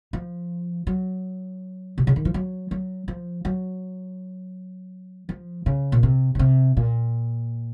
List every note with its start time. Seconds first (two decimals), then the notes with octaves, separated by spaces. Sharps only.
0.13 F3
0.87 F#3
1.98 C3
2.07 C#3
2.16 D#3
2.25 F3
2.34 F#3
2.71 F#3
3.08 F3
3.45 F#3
5.29 F3
5.66 C#3
5.92 A#2
6.03 C3
6.35 C#3
6.39 C3
6.77 A#2